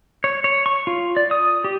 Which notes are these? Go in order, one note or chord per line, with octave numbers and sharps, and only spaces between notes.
C#5
C#5
C#6
F4
D5
D#6
G4